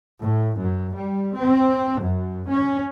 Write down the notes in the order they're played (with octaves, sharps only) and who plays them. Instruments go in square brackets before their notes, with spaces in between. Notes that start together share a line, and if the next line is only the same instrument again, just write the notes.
[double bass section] A2
F#2
G3
C4
F#2
C#4